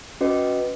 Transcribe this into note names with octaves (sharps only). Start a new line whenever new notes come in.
C#4 F#4 B4 D#5